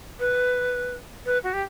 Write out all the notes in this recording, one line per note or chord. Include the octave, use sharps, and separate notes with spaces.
B4
B4
F#4
G4